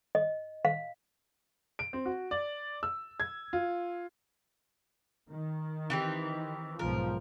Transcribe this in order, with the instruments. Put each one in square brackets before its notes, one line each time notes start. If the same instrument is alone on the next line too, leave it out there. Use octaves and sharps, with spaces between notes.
[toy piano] D#5
F5
[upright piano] D7
C4
F#4
D5
E6
G#6
F4
[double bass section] D#3
[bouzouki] E3 C4 G4
[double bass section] B1 G#2 F3 [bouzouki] A#4